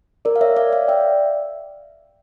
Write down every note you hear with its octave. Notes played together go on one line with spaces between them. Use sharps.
A#4 D5
F5
C#5 E5
D5 F5
D5 F5
E5 G5